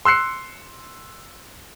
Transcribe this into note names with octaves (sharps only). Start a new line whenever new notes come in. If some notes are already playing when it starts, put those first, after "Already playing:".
C6 E6 F#6 C7 C#7